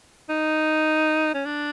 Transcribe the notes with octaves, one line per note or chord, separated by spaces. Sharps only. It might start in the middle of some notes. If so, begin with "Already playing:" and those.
D#4
C#4
D4